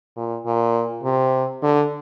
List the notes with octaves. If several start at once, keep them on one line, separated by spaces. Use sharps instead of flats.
A#2
A#2
C3
D3